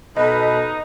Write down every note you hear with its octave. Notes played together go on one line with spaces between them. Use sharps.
B2 D#4 A4 B4 D#5